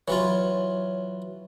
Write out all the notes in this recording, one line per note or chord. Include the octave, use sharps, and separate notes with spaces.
E3 F#3 F4 C#5